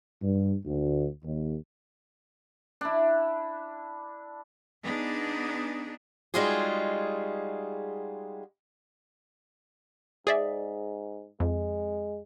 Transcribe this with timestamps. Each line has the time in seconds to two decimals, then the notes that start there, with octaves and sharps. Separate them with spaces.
0.22 G2
0.66 D2
1.24 D#2
2.81 D4 E4
4.84 B3 D4 D#4 G#4
6.34 G3 G#3 D#4 F4 F#4 G#4
10.27 G#2 G#4 D5 E5
11.40 F2 G#3